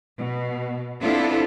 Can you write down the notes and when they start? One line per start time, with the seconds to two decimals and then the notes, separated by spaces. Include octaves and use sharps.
0.18 B2
1.02 B3 C4 D4 E4 F4 A4